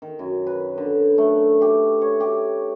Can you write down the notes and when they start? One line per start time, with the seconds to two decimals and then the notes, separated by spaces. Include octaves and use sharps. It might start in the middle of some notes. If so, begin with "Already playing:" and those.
0.02 D#3
0.19 F#2
0.47 B4
0.78 D3
1.18 A3
1.62 G4
2.01 C#5
2.20 G4